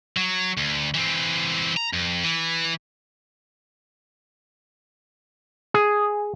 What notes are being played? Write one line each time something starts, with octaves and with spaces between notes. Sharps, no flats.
F#3
D2
E3 C4
A#5
F2
E3
G#4